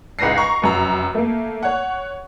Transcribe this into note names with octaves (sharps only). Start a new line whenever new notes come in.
C#2 G#2 B4 A#6 C7
A#5 C6 C#6
F1 F#2 A#5
A3 A#3
C#5 F#5